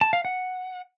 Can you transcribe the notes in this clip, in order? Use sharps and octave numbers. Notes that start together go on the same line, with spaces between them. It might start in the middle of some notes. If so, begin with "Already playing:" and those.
A5
F5
F#5